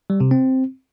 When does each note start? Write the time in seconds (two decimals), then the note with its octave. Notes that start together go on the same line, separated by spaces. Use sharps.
0.10 G3
0.20 C3
0.31 C4